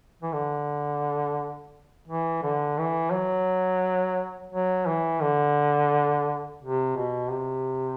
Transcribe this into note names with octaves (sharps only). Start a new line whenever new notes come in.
E3
D3
E3
D3
E3
F#3
F#3
E3
D3
C3
B2
C3